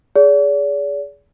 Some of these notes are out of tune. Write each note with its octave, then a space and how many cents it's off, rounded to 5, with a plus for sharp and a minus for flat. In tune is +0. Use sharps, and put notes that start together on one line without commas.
G#4 +0 D5 -40